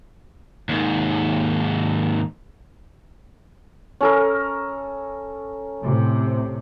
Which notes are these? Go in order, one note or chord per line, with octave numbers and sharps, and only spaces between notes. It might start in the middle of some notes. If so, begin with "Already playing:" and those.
D#2 G#2
C#4 A4 A#4
A2 C3